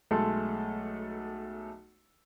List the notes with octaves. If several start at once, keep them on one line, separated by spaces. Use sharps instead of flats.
B1 G#3 A3 A4 A5 C6